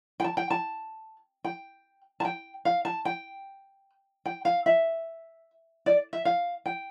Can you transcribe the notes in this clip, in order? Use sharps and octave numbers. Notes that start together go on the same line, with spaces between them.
G5
A5
G5
A5
G5
A5
G5
F5
A5
G5
G5
F5
E5
D5
E5
F5
G5